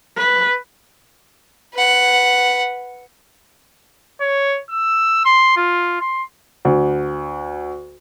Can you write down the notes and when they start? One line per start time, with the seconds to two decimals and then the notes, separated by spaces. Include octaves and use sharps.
0.17 B4
1.74 B4 F#5
4.21 C#5
4.70 E6
5.25 C6
5.57 F4
6.01 C6
6.65 D2